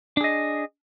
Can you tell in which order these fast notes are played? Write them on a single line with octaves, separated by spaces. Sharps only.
D4 G#4 D#5